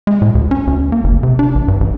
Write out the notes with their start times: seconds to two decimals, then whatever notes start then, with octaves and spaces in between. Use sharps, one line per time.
0.07 G#3
0.22 A2
0.35 D2
0.51 C#4
0.67 D2
0.92 A#3
1.04 F#1
1.23 C3
1.39 D4
1.55 A1
1.68 G2
1.80 A1